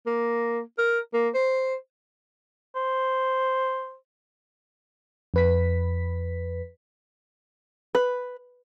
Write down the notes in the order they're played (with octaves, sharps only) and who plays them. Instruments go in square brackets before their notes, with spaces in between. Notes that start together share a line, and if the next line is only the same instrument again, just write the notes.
[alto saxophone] A#3
A#4
A#3
C5
[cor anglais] C5
[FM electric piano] F2 B4 B6
[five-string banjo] B4